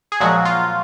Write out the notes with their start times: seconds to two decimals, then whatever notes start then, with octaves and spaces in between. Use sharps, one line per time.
0.12 G#4
0.20 A#2 F3 F#3 G#3 F#4
0.45 F4